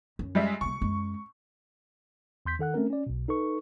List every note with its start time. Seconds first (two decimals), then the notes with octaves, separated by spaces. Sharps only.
0.19 F#2
0.35 G3 G#3 E5
0.61 C3 G3 C#6
0.81 F#2 G#3
2.46 E2 C6 G6 B6
2.59 D#3 A4 F#5 F#6
2.74 A3 C4 C#4 A#4
2.90 C#4 D5
3.07 B1 B2
3.28 D#4 A4 B4 C#6